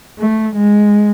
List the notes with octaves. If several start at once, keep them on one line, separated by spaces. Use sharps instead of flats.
A3
G#3